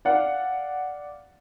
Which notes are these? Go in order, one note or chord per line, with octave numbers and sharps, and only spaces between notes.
D5 F5 F#5